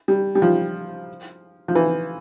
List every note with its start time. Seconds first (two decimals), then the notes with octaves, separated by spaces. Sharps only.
0.08 G3
0.35 G3
0.42 F3
1.68 F3
1.75 E3